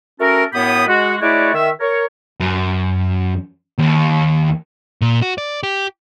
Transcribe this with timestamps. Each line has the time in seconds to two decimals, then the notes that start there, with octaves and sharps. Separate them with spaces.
0.20 A3 C#4 F#4 A4 A#4
0.53 F#2 A2 B3 G4 B5 D#6
0.88 G#3 F#4
1.21 G#3 A3 E4 F#4 C#5 D5
1.54 D#3 E5
1.80 A#4 C#5
2.40 F#2
3.78 D#2
5.01 A#2
5.22 F#4
5.38 D5
5.63 G4